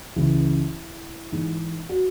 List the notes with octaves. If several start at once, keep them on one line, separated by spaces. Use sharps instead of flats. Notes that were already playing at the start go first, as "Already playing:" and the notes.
C#2 C#3 E3 E4
G#2 E3
F#4